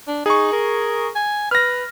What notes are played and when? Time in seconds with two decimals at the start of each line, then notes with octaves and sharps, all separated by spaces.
0.07 D4
0.26 D#4 G#4 C#6
0.53 A#4
1.15 G#5
1.51 B4 F6 A#6